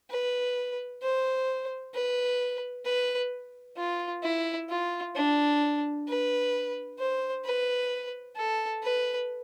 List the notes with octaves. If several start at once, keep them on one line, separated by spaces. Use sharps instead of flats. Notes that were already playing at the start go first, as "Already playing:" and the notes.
B4
C5
B4
B4
F4
E4
F4
D4
B4
C5
B4
A4
B4